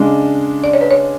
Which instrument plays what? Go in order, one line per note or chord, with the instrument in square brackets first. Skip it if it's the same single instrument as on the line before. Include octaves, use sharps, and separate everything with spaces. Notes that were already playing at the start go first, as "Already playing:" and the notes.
Already playing: [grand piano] C#3 G#3 D4 [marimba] D5
[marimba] D5
C#5
B4
C#5